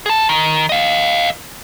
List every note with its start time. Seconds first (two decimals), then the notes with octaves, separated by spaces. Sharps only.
0.06 G#4 A5
0.29 D#3
0.69 D#5 F5